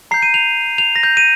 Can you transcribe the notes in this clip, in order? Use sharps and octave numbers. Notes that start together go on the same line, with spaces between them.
A#5 G6 C7
D#7
F7
F7
A#6
G6
D#7